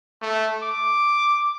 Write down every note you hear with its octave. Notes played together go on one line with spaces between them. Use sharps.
A3
D6